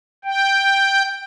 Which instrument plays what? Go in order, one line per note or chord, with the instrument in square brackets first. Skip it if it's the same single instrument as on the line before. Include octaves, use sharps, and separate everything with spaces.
[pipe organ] G5